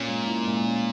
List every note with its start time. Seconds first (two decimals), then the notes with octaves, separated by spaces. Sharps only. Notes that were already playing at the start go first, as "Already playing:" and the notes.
Already playing: A#2 C#4
0.08 G#3
0.27 E4
0.46 G#3
0.66 C#4